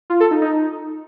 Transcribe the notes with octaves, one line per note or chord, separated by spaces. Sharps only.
F4
A4
D#4
D#4